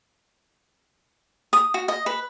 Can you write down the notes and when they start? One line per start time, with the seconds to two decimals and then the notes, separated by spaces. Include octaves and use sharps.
1.53 D#6
1.74 F#4
1.88 D#5
2.06 B4